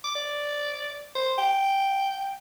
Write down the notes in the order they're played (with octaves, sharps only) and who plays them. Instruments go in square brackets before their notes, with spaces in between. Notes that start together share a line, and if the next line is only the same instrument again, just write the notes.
[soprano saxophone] D6
D5
C5
G5